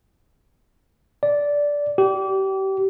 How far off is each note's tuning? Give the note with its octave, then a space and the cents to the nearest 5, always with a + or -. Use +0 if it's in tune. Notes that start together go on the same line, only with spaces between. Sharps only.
D5 -10
G4 -30